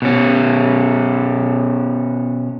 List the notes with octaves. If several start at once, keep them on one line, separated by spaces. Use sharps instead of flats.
B2 C#4